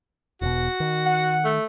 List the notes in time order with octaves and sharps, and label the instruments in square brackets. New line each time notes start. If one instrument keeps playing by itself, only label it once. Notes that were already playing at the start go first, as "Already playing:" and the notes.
[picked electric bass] E1 B2 [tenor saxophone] F#4
[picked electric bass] D#3
[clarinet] F#5
[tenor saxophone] A3